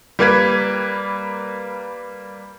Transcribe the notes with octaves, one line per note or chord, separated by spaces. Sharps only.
G3 A#3 B4 G#6 B6